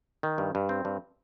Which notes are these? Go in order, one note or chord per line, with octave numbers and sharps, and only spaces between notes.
D#3
G2
G2
C4
G2